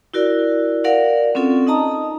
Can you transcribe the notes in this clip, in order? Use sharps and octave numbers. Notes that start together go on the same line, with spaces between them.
E4 F#4 A#4 D5
A#4 D5 F5 F#5
C4 C#4 F4 A4
D#4 D#5 A5 A#5 D#6